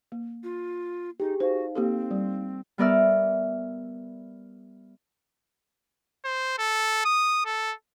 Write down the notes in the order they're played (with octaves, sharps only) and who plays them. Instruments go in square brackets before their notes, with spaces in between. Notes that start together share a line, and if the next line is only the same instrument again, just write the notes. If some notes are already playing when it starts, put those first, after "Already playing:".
[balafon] A#3
[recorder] F4
[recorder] D#4 [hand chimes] G4 G#4
[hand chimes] D#4 F5 [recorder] F#4 [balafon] C5
[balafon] A#3 G4 A4 [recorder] C4
[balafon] G3
[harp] G3 B3 A#4 D5 E5 F6
[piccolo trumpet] C5
A4
D#6
A4